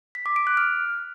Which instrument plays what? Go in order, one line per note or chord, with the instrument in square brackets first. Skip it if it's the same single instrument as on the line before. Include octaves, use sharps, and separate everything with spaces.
[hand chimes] B6
D6
D7
F#6
F6